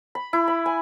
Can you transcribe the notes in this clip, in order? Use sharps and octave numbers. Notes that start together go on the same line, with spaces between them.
B5
E4
B5
G#5